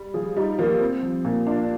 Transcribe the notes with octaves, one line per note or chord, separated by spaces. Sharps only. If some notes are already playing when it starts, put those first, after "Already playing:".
Already playing: G3
F3 G#4
G3 D#4
F3 A#3
C4
F3
A#2
D4 F4